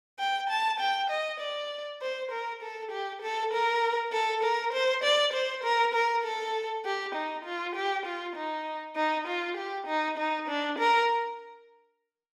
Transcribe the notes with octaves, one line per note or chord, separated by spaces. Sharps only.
G5
A5
G5
D#5
D5
C5
A#4
A4
G4
A4
A#4
A4
A#4
C5
D5
C5
A#4
A#4
A4
G4
D#4
F4
G4
F4
D#4
D#4
F4
G4
D#4
D#4
D4
A#4